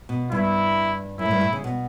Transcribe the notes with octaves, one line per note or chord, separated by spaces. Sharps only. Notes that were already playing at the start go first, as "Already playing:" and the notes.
B2
G2 E4
F#2 E4
A2
G2
A2
C#3
B2